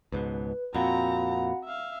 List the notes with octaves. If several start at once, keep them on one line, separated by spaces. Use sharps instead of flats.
C#2 G#2 B2 B4
F2 A#2 C4 F#4 F5 F#5 A#5 B5
E5 F5